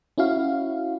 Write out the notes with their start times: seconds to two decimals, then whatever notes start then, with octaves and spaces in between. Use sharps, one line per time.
0.18 C#4 E4 F#4 F5